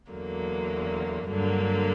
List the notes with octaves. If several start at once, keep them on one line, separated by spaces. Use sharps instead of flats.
E2 D3 F#3 A#3
G2 D3 F#3 A#3